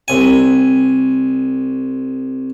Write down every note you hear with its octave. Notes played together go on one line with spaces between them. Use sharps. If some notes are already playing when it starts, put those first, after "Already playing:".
C2 G#5